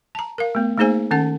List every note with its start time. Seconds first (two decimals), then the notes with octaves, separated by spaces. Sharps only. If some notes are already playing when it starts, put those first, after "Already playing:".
0.15 A5 A#5
0.38 A#4 F5
0.55 A3 B3
0.78 A3 A#3 D#4 G#4 C5 G#5
1.11 D#3 C#4 F#5 A5